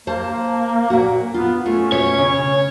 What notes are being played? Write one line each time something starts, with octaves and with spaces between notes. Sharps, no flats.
A#3 C5 A5
A#2 F#4
B3 F4
A3 C#4 F4
B2 C#5 E5
C#3